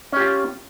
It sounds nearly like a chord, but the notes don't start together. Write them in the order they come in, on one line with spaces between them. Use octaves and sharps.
C#4 G4 F4